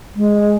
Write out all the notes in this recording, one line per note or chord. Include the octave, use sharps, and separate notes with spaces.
G#3